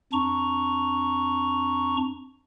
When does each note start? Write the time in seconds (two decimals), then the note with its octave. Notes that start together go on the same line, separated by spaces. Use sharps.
0.13 F2 D4 A#5 C#6